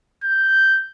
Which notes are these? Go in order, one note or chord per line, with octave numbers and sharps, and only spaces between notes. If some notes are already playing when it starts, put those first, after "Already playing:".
G6